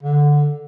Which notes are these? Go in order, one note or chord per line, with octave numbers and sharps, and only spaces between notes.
D3